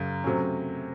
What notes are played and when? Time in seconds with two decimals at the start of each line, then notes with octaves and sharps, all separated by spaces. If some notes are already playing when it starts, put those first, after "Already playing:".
Already playing: F#2 C#3
0.24 C3 F#3 A3 C#4